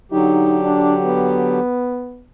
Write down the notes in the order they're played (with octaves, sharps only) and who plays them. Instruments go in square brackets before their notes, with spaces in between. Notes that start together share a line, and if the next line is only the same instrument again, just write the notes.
[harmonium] D3 F#3 G4 [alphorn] D#4
[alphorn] D4
B3